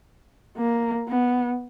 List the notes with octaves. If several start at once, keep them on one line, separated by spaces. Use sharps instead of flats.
A#3
B3